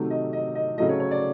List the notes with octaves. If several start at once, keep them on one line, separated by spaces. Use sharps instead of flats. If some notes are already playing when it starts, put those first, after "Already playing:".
Already playing: C3 D#3 F#3 A3
D#5
D#5
D#5
C#3 F#3 A3 D#5
C#5
C#5
D5